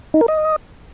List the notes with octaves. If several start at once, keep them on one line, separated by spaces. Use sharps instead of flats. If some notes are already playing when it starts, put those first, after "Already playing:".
D#4
A#4
D#5